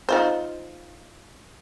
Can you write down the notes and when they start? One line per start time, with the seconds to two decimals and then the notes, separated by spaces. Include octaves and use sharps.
0.09 D#4 F4 C5